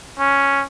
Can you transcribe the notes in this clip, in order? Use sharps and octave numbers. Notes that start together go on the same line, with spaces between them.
C#4